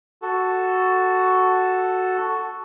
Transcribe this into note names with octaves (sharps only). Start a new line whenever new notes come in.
F#4 A4